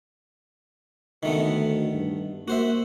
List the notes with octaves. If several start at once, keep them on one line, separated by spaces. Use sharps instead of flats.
D2 D#3 A3 B3
G2
A#3 F#4 C5 E5